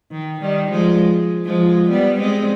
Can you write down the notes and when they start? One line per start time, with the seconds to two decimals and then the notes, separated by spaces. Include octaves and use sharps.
0.12 D#3
0.41 D#3 G3
0.71 F3 G#3
1.45 F3 G#3
1.90 G3 B3
2.20 G#3 C4